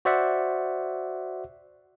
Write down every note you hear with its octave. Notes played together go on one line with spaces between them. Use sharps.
F#4 C5 D5 E5 F#5